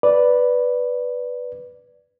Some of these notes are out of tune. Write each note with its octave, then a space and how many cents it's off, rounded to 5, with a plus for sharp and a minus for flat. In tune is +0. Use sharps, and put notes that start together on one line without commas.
B4 +0 D5 -5